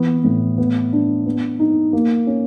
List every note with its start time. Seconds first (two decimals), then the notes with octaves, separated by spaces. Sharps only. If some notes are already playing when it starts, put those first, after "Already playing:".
Already playing: E3 B3
0.24 A2
0.58 B3
0.93 D4
1.26 B3
1.60 D#4
1.93 A#3
2.27 C#4